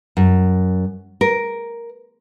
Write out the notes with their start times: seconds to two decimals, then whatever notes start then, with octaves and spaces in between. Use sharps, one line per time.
0.17 F#2
1.21 A#4